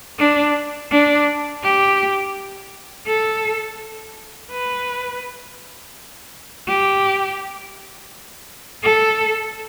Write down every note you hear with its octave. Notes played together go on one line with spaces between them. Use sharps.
D4
D4
G4
A4
B4
G4
A4